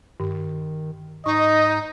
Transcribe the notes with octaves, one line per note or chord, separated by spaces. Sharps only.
G2 D#3
G#2 D#4 D#5 C#6